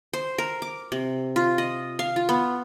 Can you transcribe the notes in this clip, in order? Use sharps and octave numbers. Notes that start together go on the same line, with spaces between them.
C5
A#4
D6
C3
F4
D#5
F5
F4
B3